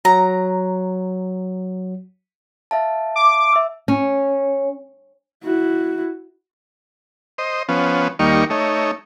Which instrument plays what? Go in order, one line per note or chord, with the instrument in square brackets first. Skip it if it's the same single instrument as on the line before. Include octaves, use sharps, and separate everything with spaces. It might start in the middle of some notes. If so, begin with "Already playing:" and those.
[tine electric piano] F#3 [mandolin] A#5
[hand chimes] E5 F5 A5
[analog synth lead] D6
[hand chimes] E5 E6
[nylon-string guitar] C#4
[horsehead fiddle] E4 F#4
[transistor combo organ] C5 D#5
F3 B3 C#4
D#2 G3 A#3 D#4 C#6
A3 D#4 C#5